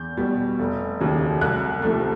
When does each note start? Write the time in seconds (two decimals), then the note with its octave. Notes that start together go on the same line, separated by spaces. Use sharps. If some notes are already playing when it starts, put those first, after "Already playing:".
Already playing: E2 G6
0.17 B2 G3
0.59 F1
1.00 D#2 C#3 F#3
1.41 C2 F#6
1.82 C3 F3 A3